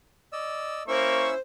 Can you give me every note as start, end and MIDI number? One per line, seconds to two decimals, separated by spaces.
0.33 0.83 74
0.33 0.83 75
0.33 0.83 88
0.88 1.28 58
0.88 1.34 61
0.88 1.34 64
0.88 1.39 72
0.88 1.28 85
0.88 1.34 88